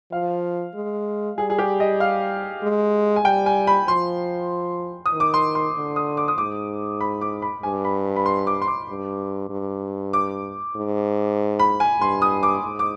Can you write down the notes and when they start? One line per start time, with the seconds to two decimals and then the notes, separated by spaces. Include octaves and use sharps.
0.12 F3 F5
0.75 G#3
1.38 G3 G#4
1.50 G#4
1.58 G4
1.80 D#5
2.00 F5
2.63 G#3
3.16 G#5
3.25 G3 G5
3.46 G#5
3.67 B5
3.88 F3 C6
5.06 D#6
5.13 D#3
5.20 D6
5.34 C6
5.55 C6
5.76 D3
5.96 D#6
6.17 D6
6.28 D#6
6.38 G#2 D6
7.00 B5
7.21 D6
7.42 B5
7.63 G2 G#5
7.85 B5
8.16 B5
8.26 C6
8.47 D6
8.62 C6
8.68 D6
8.89 G2
9.50 G2
10.13 D6
10.76 G#2
11.59 B5
11.80 G#5
12.01 G2 C6
12.22 D#6
12.43 D6
12.64 G#2
12.79 D6